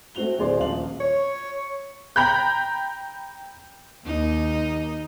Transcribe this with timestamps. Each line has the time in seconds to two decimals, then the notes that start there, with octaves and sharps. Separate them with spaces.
0.15 A3 C4 F#4 F7 G7
0.39 D1 G#4 C5 D5 C6
0.58 D#1 A#1 F5 F#7
1.00 C#5
2.16 G5 A#5 B5 G6
4.06 D#2 D#4